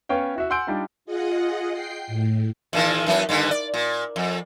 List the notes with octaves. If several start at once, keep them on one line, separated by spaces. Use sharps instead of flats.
B3 C#4 C#5 F5 G5
E4 F#4 E5
F#5 G#5 C6 E6 G6 D7
G3 D4 D#4 F4
F4 G#4 D#5 F#5
G5 C7
A2
E2 A#2 D#3
F#2 E3 B3
G2 D3 D#3
D5
A#2
F2